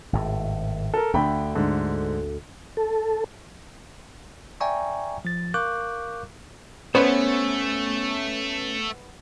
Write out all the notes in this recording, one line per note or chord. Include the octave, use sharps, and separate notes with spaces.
G#1 A2
A4 A#4
D2 D3 A3 G5 B5
G#2 D3
A4
D5 E5 G5 G#5 A#5 C#6
F3 A6
A#4 F5 C#6 D6 F#6 G6
A3 B3 C#4 C5 C#5